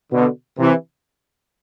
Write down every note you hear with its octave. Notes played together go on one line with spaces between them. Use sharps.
B2 D3
C3 E3